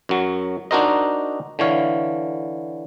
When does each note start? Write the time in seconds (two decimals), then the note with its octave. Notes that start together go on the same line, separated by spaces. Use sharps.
0.09 F#2 F#3
0.71 D4 D#4 F#4 A#4 C5 D#5
1.59 D3 E3 C#5 F5